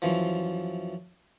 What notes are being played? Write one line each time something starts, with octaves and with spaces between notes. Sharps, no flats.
F#2 E3 F3